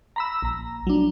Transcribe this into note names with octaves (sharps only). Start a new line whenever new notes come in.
A#5 B5 E6
A#1 A#5
F#3 D4